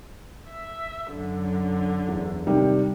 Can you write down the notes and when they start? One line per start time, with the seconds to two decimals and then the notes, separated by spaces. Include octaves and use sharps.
0.51 E5
1.12 F#2 D3
2.08 E2
2.47 C3 D#3 G3